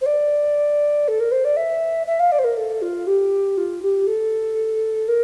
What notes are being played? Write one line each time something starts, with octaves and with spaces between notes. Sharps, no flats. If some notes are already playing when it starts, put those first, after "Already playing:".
C5
D5
A4
A#4
C5
D5
E5
E5
F5
D5
C5
A#4
A4
F4
G4
F4
G4
A4
A#4